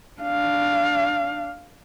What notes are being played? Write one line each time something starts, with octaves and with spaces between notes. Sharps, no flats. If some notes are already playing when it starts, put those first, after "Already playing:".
D4 F5